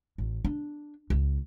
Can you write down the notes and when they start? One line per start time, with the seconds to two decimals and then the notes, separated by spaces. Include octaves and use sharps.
0.18 A1
0.45 D4
1.10 C#2